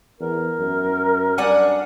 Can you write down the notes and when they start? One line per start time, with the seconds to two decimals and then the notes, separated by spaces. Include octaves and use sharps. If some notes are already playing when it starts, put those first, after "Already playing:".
0.20 E2 A#4
0.59 F#2
1.38 G2 D4 F#5 G#5